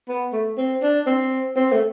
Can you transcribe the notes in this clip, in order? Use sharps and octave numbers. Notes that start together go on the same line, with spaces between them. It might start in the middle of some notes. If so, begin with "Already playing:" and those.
B3
A3
C4
D4
C4
C4
A3